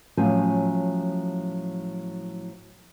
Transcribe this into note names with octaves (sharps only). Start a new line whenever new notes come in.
A2 F3 F#3 C#4 C5 G#5